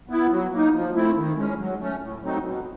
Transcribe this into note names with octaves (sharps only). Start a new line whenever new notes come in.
B3 E4
F#3
A#3 D#4
F3
A3 C4 E4
D#3
G#3 C#4
F#3
A3 C#4
A2
F#3 A3 C4 D#4
B2